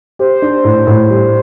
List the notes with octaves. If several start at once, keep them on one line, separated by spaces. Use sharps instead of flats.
G4 C5
D4
A2
A2
G3